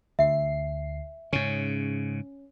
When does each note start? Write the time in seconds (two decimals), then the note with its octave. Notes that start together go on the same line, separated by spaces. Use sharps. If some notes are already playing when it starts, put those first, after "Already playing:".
0.19 D2 E5 C7
1.33 G#2 C#3 C#4